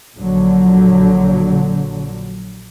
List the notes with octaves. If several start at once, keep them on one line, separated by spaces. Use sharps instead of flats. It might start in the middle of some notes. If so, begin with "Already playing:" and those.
A#1 D3 F#3